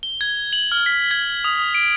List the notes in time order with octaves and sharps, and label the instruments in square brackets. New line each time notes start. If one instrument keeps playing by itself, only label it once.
[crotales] G7
G#6
F#7
F6
B6
G#6
D#6
D7